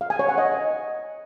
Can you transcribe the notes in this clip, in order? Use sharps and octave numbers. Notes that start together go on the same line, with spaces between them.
F5
G#5
C#5
F#5
D#5